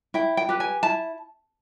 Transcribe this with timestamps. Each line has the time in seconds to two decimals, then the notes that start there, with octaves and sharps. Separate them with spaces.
0.14 E4 G5
0.37 G5
0.49 G4 B4
0.60 G#5
0.83 E4 A5